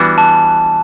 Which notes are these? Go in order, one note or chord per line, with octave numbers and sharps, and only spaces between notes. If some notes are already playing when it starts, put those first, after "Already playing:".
Already playing: E3 G3 B3 D4 F#4
A5